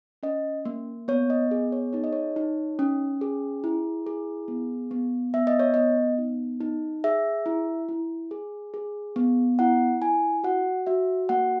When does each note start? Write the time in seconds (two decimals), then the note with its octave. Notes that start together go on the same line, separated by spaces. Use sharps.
0.23 C#4 D#5
0.65 A#3
1.08 B3 C#5
1.30 D#5
1.51 G#4
1.72 C#5
1.93 D#4 C#5
2.04 D#5
2.13 C#5
2.36 D#4
2.79 C#4
3.21 G#4
3.64 E4
4.07 G#4
4.48 B3
4.91 B3
5.34 B3 E5
5.47 D#5
5.59 C#5
5.74 B3 D#5
6.18 D#4
6.61 D#4
7.04 G#4 E5
7.46 E4
7.89 E4
8.31 G#4
8.74 G#4
9.16 B3
9.59 E4 F#5
10.01 E4 G#5
10.44 F#4 F#5
10.87 F#4 E5
11.29 A#3 F#5